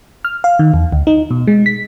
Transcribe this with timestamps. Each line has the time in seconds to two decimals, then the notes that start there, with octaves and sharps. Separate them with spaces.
0.25 F6
0.44 F5
0.59 D#3
0.74 E2
0.93 D2
1.07 D#4
1.31 B2
1.47 G#3
1.66 B6